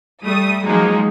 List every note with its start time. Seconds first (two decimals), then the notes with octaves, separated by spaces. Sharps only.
0.24 G3 A3 D#6
0.66 F3 F#3 G#3 A#3 D#4